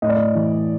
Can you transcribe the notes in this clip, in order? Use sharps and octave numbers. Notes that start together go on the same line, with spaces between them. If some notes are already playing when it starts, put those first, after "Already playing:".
A2 D#5
D5
D#5
E3